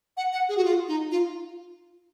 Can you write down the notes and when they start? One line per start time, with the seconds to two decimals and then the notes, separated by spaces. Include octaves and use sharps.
0.17 F#5
0.33 F#5
0.49 G#4
0.57 F#4
0.64 F4
0.88 D#4
1.11 F4